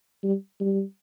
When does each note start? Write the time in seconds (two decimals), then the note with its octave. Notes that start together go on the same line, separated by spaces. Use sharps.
0.23 G3
0.60 G3